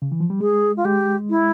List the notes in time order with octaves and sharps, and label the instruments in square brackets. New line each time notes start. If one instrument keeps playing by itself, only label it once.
[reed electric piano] C#3
E3
F3
G3
[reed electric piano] G#3 [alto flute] G#4
[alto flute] F4
[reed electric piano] G#3 [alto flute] G4
[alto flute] E4